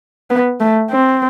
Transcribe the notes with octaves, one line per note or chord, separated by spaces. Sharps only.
B3
A3
C4